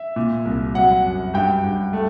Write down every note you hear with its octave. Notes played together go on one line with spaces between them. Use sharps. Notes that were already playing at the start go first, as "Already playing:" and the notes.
Already playing: E5
A#2
C2
F#3 F#5
F#2
G2 G5
G2
A3